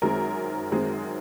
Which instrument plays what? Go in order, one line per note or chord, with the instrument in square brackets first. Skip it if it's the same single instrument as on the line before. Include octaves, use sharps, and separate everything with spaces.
[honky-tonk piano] F#2 D#3 G#3 C4 A#4
F#2 D#3 G#3 C4